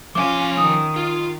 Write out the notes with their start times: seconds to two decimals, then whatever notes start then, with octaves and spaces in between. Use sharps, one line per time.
0.15 F3 C#4 F4 F5 G#5 D6
0.57 D#3 D#6
0.96 F4